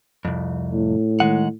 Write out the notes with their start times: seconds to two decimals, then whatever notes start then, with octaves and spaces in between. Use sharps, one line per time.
0.25 C2 F2
0.73 A2
1.20 D#3 G#3 F#5